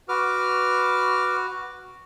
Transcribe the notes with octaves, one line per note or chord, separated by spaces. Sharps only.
F#4 B4 D6 F6